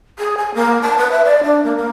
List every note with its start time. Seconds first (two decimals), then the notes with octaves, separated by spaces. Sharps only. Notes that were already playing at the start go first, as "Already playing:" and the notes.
0.19 G#4
0.37 G#5
0.55 A#3
0.82 A5
0.98 B4
1.11 E5
1.25 D5
1.43 D4
1.64 A#3
1.77 A#3